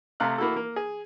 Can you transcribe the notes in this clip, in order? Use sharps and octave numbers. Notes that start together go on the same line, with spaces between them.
C3 A3 F5 A#5 F6 F#6
A#3 E4 F#4 A4
A#3
G#4